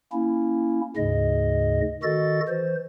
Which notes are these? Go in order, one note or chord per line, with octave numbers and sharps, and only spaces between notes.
A#3 C#4 E4
D2 G#2 C#3 D#5
D#3 F#4 A4 D#5 A6
E3 C5